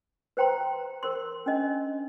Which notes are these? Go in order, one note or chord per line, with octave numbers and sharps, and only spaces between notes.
B4 C5 G5 A#5 C6
A#4 C5 C6
C#4 D4 D#5